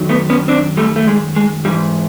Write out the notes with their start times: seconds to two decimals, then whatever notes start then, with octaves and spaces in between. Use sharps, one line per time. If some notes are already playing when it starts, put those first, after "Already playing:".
Already playing: F#2 D#3 F#3
0.09 A3 B3
0.30 B3 C#4
0.48 C4 D4
0.77 G3 A3
0.96 A3
1.07 G#3
1.36 G#3
1.65 G#2 E3 G3